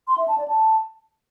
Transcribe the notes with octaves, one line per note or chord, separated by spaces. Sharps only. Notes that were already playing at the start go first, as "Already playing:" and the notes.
C6
E5
A5
D5
A5